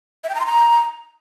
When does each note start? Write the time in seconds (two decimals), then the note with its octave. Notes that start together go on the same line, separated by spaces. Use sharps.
0.24 E5
0.29 G5
0.35 A#5
0.40 C6
0.46 A#5